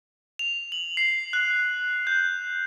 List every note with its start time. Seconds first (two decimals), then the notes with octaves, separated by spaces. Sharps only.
0.39 F7
0.72 F#7
0.97 C7
1.33 F#6
2.07 G6